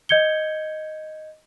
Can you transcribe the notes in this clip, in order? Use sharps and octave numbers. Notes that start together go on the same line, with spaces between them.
D#5 G6 G#6 C#7 G7